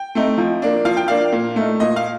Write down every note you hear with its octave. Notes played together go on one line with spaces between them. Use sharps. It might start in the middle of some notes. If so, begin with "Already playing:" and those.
Already playing: G5
A3 C4 D#4
F3
A#3 D4
F3 F5
G5
A#3 D4 F5
A#2
A3 D#4
A#2 D#5
F5